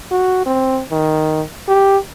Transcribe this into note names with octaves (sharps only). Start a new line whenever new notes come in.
F#4
C4
D#3
G4